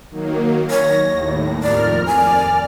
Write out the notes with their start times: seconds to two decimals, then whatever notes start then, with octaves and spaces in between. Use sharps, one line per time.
0.11 D#3 F#3 A#3
0.70 C#5 A#6
1.10 D#2 A2
1.63 F2 A#4 D5 F6
2.07 D5 G#5 F6